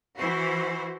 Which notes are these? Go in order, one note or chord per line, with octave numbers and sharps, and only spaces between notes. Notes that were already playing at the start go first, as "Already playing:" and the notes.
E3 F#4 C5